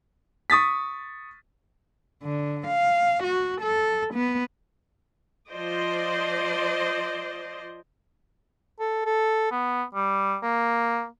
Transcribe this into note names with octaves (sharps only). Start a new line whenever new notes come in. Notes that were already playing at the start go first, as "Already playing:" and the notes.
C#6 D#6 A6 B6
D3
F5
F#4
A4
B3
F3 C5 D5 D#5 C6
A4
A4
B3
G3
A#3